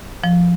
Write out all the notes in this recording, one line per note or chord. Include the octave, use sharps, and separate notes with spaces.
F3